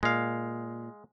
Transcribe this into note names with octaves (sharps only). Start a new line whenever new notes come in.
A#2 G#3 F5